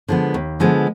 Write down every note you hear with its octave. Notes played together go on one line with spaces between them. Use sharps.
D3 F3 G#3 B3
D#2
D3 F3 G#3 B3